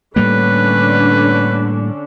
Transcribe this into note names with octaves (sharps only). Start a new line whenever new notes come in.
A2 D3 G3 A#3 C#4 D4 B4